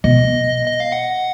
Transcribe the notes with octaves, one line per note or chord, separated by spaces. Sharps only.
B2 D#5
D#5
F5
F#5